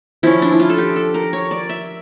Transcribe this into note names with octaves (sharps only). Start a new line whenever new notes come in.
F3 C#4 E4
D4
E4
F4
A4
G4
A4
A#4
C#5
D5
E5